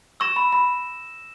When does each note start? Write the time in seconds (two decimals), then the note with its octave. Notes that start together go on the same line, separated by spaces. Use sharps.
0.20 C#6 E6 A#6 E7
0.36 B5
0.52 B5